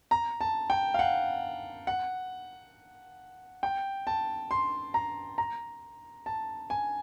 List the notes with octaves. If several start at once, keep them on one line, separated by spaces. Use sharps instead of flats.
A#5
A5
G5
F5
F#5
F#5
G5
A5
C6
A#5
A#5
A5
G#5